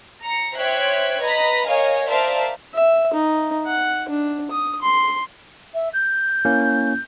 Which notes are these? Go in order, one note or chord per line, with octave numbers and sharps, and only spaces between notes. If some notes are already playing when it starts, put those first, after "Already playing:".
A#5 C#7
C5 C#5 E5 G5 F#6 G#6
B4 D#5 A#5 B5
A#4 C#5 D#5 F5 G#5
A#4 C5 D5 E5 F5 A5
E5
D#4
F#5
D4
D#6
C6
E5
G6
A#3 C#4 E4